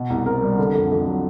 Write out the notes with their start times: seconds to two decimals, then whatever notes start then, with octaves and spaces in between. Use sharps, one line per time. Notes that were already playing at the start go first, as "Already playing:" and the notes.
Already playing: B2
0.10 C2
0.26 C4 A#4
0.42 G3
0.58 D3
0.75 F2
0.91 F2
1.07 F#3